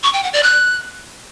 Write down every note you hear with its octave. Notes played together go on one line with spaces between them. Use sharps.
C#6
G5
F#5
D5
F#6